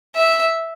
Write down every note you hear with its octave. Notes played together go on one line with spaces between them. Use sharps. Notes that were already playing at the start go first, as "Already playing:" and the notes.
E5